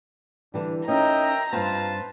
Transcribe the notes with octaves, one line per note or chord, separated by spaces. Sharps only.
D3 E3 G3 D4
C#4 D#4 A#4 D#5 E5 G5 A#5
G2 C4 F4 B4 C5 A5